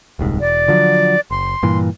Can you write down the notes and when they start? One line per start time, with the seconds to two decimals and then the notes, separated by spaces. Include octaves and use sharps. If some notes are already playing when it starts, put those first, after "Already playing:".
0.19 D#1 C2 G#2
0.40 E1 D5
0.68 D3 F3 F#3
1.31 F#1 C6
1.63 G2 A#2 E3